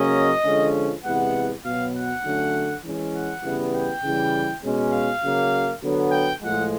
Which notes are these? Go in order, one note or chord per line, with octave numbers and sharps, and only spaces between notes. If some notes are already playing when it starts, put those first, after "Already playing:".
Already playing: C#3 F#3 A#3 C#4 D#5
D3 F3 G#3 C#4
C3 E3 G#3 B3 F#5
B2 F#3 B3 F5
F#5
D3 F#3 A3 C#4
E3 G#3 C#4
F#5
C#3 E3 G3 B3
G5
C#3 E3 G3
B2 G#3 C#4
F5
C#3 F#3 A#3
D3 F#3 B3
G5
A2 F3 G#3 F#5